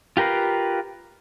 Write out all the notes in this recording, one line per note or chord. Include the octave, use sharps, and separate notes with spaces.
F4 G4 A#4 B4 F5